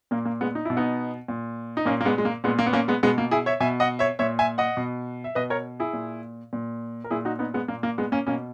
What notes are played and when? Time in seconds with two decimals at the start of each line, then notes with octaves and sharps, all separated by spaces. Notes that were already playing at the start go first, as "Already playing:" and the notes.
0.11 A#2 A#3
0.25 A#3
0.41 G#3 B3
0.55 D#4
0.65 B2 E4
0.77 B3 D#4
1.28 A#2
1.77 D#4
1.86 A#2 A#3 C#4
2.01 A#3
2.05 G#3 B3
2.18 G#3
2.25 A#3
2.44 A#2 G#3 B3
2.59 A#3
2.66 B3
2.73 A#3 C#4
2.88 G#3 B3
3.03 B2 G#3 B3
3.18 A#3
3.31 E4 G#4
3.46 C#5 E5
3.60 B2 E5 G#5
3.80 D#5 F#5
3.99 C#5 E5
4.19 A#2 C#5 E5
4.39 E5 G#5
4.58 D#5 F#5
4.77 B2
5.24 E5
5.35 B2 B4 D#5
5.50 A#4 C#5
5.80 E4 G#4
5.93 A#2
6.53 A#2
7.04 A#4
7.11 A#2 E4 G#4
7.25 D#4 F#4
7.39 B3 D#4
7.54 G#3 B3
7.68 A#2 A#3
7.83 A#3
7.98 G#3 B3
8.12 A#3 C#4
8.27 B2 A#3 C#4